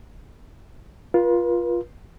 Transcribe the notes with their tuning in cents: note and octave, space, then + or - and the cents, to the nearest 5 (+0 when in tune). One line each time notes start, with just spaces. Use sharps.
F4 +0 B4 -45